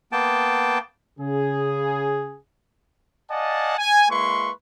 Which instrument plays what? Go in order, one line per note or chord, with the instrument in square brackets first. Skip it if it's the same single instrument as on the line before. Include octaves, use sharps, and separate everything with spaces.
[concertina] A#3 B3 G5 A5
[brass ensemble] C#3 G#4
[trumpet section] D5 D#5 F5 F#5 G#5 A5
G#5
G#3 A#3 E4 B4 C6 C#6